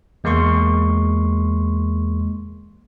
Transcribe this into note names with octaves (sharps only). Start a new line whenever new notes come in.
E2 G#3 A#3 C6 C#6